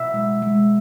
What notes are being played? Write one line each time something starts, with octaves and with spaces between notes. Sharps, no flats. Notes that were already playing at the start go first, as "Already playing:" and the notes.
Already playing: B2 E5
G#3
G#3